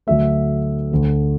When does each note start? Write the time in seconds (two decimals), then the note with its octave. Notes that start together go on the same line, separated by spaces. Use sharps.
0.07 D2 D3 F#3 A3 E5
0.91 D2 D3 A3